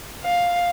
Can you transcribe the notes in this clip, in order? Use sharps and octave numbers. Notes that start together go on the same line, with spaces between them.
F5